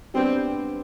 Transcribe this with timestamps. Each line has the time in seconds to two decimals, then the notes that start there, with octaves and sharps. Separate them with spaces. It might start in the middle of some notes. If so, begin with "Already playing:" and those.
0.14 G3 B3 C4 D4 G4